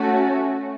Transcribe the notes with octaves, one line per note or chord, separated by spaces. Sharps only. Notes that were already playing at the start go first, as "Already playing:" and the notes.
Already playing: A3 C#4 F#4